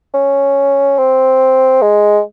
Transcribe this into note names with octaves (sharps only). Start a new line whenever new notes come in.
C#4
C4
G#3